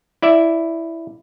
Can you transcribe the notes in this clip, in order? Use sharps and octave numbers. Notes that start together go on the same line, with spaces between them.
E4 D5 E5